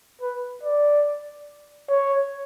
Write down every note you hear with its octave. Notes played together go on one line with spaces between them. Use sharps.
B4
D5
C#5